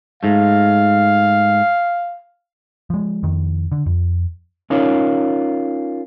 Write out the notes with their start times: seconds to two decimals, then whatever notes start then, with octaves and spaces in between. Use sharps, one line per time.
0.23 G#2 A3 F5
2.90 F3 G#3
3.23 F2 D#3
3.72 D3
3.86 F2
4.70 C#4 D#4 F4 A#4 C#5